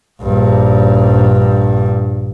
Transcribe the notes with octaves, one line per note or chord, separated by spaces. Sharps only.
A#1 G2